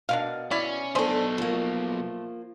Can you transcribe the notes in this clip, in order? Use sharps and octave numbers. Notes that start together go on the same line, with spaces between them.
B2 D4 A#4 F5
C#4 E4 D5
B1 B2 A3 D4 G#4 A4 C5
F3 A#3